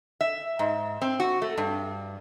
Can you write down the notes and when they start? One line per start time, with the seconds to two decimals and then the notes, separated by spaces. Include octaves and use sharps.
0.21 E5
0.59 G#2
1.02 C4
1.20 F#4
1.42 A3
1.57 G2